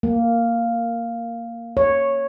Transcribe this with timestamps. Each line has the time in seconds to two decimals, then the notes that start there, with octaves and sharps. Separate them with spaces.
0.03 A#3
1.77 C#5